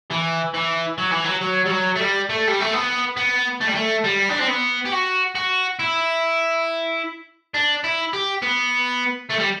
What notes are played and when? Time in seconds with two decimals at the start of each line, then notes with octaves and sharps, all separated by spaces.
0.11 E3
0.54 E3
0.98 F#3
1.11 E3
1.25 F#3
1.42 F#3
1.66 G3
1.71 F#3
1.96 A3
2.00 G3
2.29 A3
2.47 G3
2.60 A3
2.73 B3
3.17 B3
3.61 A3
3.67 G3
3.75 A3
4.04 G3
4.30 D4
4.39 C4
4.48 B3
4.85 G4
4.92 F#4
5.35 F#4
5.79 E4
7.54 D4
7.84 E4
8.13 G4
8.42 B3
9.30 A3
9.39 G3